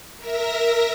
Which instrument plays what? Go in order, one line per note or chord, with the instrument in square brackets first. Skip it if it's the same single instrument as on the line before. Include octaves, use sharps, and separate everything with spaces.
[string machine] A#4 E5 A#6